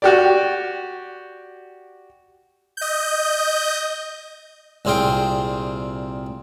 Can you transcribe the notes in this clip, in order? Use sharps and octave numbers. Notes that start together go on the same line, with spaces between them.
F#4 G4 D5
D#5 G6
C2 A#2 C4 G#4 F5 G5